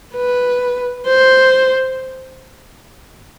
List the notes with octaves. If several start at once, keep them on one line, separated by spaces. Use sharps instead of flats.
B4
C5